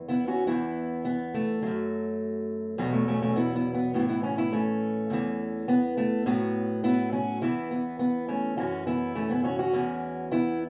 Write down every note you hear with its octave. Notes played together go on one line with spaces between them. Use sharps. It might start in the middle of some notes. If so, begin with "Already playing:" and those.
Already playing: E2 E3
B3 E4
C#4 F#4
E2 E3 B3 E4
B3
A3
F#2 F#3
E2 B2 F#3 B3
A3
A3 C#4
A3 C#4
B3 E4
B3 E4
B3
A2 E3 B3 E4
B3 E4
C#4 F#4
B3 E4
A3 C#4
E2 E3
B3
A3
A2 F#3 B3
B3 E4
C#4 F#4
E2 E3 B3 E4
B3
B3
A3 C#4
F#2 E3 C#4 F#4
B3 E4
A3 C#4
B3 E4
C#4 F#4
C#4 F#4
E2 E3
B3 E4